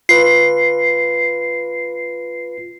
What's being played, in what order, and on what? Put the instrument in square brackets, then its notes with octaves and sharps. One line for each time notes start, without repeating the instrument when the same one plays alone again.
[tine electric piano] F4 B4 [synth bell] C7